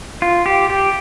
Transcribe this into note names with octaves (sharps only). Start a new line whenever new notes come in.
F4
G4
G4